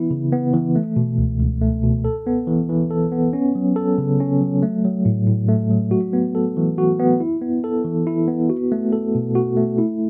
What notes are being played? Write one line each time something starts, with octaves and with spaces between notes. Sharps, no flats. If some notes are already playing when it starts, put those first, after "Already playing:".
Already playing: E3 B3 E4
C#3
B3
E3
A3
B2
C#2
C#2
A3
B2
A4
B3
E3
E3
A4
B3
C#4
F#3
A4
C#3
C#4
F#3
A3
F#3
A2
A2
A3
F#3
F#4
B3
A4
E3
F#4
B3
E4
B3
A4
E3
E4
B3
F#4
A3
A4
B2
F#4
A3
E4